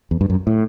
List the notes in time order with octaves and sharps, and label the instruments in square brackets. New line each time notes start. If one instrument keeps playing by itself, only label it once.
[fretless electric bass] E2
G2
F#2
A2